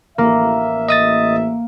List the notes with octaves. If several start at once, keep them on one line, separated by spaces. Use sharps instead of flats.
A1 A#3 E5
D#5 D#6 A6